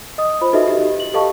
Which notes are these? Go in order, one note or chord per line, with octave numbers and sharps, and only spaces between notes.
D#5 D#6
F4 C5 B5
D#4 F#4 A4 B4 D#5 E5
G4 D#5
F#7
G4 A4 D#5 F5 A5 C#6